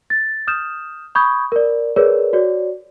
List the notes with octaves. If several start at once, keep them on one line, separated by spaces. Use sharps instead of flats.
A6
D#6 F6 G6 E7
B5 C#6 D#6 G6 G#6
A#4 D5
G#4 A#4 B4 C#5 D5
F#4 C#5 D5